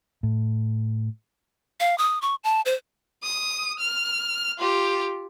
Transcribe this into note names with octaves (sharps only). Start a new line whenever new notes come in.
A2
F5
D#6
C#6
A5
C5
D#6
F6
F4 G4